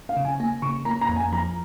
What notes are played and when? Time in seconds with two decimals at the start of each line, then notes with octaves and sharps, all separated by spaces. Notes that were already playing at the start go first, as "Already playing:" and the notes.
0.09 F5
0.17 C#3
0.25 G#5
0.40 A#3 G#5
0.62 C#3 C#6
0.85 A#3 A#5
1.01 A#5
1.09 F2
1.16 G#5
1.32 F3 A#5